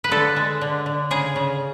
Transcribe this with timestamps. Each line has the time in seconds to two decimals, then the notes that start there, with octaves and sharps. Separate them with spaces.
0.04 B4
0.11 D3 A4
0.36 G#3
0.61 D3
0.86 D3
1.11 C#3 G#4
1.36 C#3